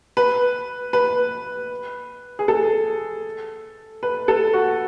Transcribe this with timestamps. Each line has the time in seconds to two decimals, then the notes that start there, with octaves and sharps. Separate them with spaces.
0.17 B4
0.93 B4
2.39 G#4
2.48 A4
4.03 B4
4.28 A4
4.53 F#4